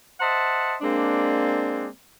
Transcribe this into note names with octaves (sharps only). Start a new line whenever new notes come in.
C5 D#5 E5 F#5 A5
G#3 A#3 C4 D4